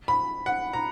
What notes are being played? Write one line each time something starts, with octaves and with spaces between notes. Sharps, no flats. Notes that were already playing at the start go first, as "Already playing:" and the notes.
B5
F#5
A#5